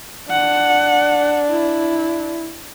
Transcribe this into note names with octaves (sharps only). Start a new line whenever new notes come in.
D4 F#5
E4